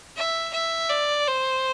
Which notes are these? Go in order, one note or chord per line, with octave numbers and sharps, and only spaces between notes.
E5
E5
D5
C5